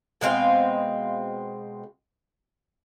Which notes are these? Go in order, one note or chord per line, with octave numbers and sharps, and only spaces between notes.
B2 G#3 C4 F5